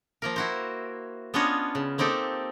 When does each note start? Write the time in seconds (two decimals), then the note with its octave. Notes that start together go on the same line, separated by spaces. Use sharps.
0.22 F3 A#3 A#4
0.36 E4 F#4 C5
1.34 B3 C#4 D4 F4 C#5 D#5
1.75 C#3
1.98 A#3 C4 D#4 G4 A4